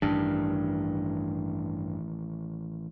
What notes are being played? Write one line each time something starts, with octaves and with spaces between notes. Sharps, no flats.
A1 G2 D#3 D4